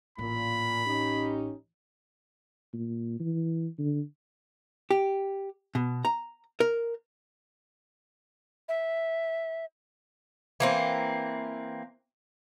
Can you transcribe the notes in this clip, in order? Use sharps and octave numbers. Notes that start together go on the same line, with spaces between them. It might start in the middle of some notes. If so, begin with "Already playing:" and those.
A1 A#2 B5
C#4 D#4 G4
A#2
E3
D3
G4
B2
A#5
A#4
E5
E3 A#3 C4